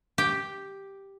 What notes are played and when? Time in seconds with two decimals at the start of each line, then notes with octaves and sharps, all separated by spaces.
0.18 G4